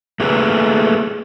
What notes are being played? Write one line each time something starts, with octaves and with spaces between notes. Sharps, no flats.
A3 A#3 G#4 B4